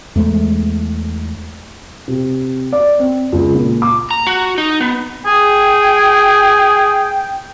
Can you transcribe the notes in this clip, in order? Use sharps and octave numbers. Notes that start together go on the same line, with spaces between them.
E2 G#3 A3
C3
D5
C4
C#2
A#2
D6
A#5
F#4
D#4
B3
G#4 G5